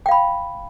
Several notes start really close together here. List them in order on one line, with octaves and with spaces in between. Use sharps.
G5 F5 B5